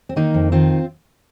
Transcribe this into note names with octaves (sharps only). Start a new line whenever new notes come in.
C4
D#3 A#3 D#4
F2
D#3 C4 F4